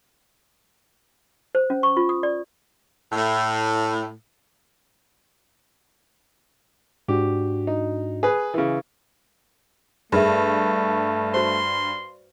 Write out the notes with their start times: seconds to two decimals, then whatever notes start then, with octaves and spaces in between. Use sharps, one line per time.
1.55 C5
1.70 C#4
1.83 C#6
1.97 F4
2.09 D#6
2.23 D5
3.12 A2
7.08 G#2 D4 F#4 G4
7.67 D#4
8.23 G#4 B4
8.54 C#3 E3
10.12 G2 A3 G#4 A#4 E5
11.34 F#4 C5 C6